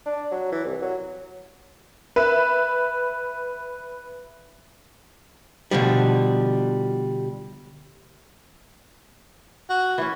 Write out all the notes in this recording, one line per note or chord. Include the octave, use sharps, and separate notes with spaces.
D4
F#3
E3
C2
F#3
B4 E5
B2 D3 F3 G3
F#4
E3 C#4